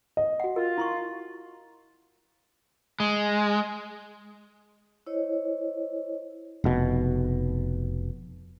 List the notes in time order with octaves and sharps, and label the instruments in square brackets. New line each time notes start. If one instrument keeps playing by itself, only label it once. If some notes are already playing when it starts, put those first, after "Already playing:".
[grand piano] D#5
[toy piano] F#4 F#5
[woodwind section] F4 [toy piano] A#4
[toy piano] E4 C6 C#6
[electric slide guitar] G#3
[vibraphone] E4 C5 C#5 D#5
[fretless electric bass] F1 B2